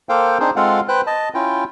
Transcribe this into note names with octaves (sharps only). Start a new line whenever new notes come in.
A#3 A4 C5 F5 G5
C4 D4 D#4 G#4 C5
G#3 C4 F4 A4 F5 F#5
B4 C5 G5 F#6
D#5 A5
C#4 E4 F4 G5